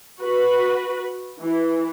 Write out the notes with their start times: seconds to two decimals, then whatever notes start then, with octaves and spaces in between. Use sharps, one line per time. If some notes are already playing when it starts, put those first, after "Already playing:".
0.21 F#4 B4
1.40 E3